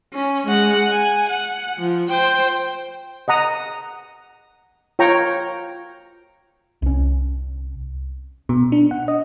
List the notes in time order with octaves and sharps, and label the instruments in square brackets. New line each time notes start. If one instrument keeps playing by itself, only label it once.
[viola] C#4
G#3 F#5
G#5
F#5
F3
C5 G5
[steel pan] D#5 F#5 A#5 D#6
F4 C#5 G5 A#5 C#6
[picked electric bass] C2 C#4
[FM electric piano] B2
D4
F#5
D#5